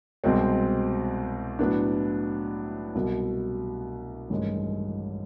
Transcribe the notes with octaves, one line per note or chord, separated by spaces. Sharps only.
C2 B2 G#3 C4
A2 F#3 B3 D4
C2 B2 F#3
A1 G2 D#3 G#3